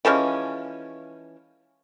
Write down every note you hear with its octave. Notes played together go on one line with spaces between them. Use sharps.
E3 F3 G#3 C#4